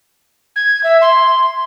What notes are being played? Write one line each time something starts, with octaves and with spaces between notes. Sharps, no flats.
G#6
E5
C6